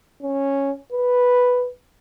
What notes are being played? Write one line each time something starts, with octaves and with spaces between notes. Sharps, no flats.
C#4
B4